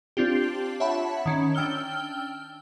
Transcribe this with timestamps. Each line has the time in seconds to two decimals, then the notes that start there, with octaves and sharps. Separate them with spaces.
0.17 C4 D4 F4 G4
0.80 C#5 E5 F#5 A5 B5
1.26 D#3 C#4
1.55 D4 G5 E6 F6 G7